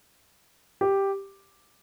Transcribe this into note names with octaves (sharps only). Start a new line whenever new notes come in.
G4